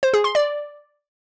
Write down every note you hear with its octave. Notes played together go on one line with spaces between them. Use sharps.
C5
G#4
C6
D5